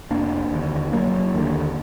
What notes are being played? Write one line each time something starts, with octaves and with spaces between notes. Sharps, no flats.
F1 A#3 D4
D#2 D3
F1 F#3 A#3
D#2 D3 D#3